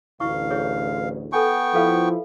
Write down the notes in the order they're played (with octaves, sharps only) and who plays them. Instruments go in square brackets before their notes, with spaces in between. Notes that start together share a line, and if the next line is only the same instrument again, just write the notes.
[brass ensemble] A1 D2 [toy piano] E4 C#6 [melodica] F5
[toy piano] E4 G#4 C#5
[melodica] B3 G5 C#6 [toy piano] A4 G#5
[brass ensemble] F3 E4 [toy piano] A4 B4 F5